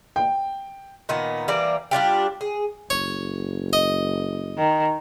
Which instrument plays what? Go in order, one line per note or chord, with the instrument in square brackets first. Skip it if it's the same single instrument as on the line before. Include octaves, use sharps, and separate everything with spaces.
[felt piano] G5
[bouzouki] A#2 D#3 B3
E3 G3 A#3 D5
G3 D4 F4 G4
G#4
[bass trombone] F#1 [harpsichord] C#5
[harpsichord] D#5
[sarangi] D#3